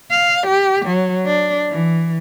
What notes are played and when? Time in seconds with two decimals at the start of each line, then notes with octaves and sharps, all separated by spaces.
0.11 F5
0.47 G4
0.86 F#3
1.26 D4
1.70 E3